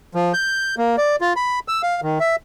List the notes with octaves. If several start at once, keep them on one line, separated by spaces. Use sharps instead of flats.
F3
G6
A#3
D5
F4
B5
E6
F5
D#3
E5